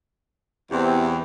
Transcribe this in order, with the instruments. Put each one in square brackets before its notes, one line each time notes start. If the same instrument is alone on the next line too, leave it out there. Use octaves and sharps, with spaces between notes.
[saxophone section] E2 [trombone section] C3 C4